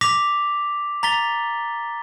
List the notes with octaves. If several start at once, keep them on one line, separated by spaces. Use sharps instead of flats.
D6 A#6 B6 F7
A#5 A6 B6 G7